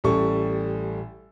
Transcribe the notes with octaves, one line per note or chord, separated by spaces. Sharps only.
A1 G3 A4 C#6